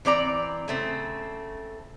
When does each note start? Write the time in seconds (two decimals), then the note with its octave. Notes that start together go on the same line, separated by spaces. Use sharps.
0.05 E3 C4 D5 A#5
0.68 C#3 A3 C4